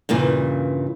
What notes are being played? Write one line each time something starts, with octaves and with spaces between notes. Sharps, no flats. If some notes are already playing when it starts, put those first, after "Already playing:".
G2 A#2 C#3 E3